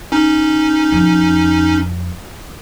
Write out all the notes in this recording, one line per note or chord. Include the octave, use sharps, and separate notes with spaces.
C#4 D#4
F2